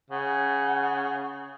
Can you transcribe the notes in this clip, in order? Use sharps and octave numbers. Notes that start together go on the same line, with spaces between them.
C#3 F#5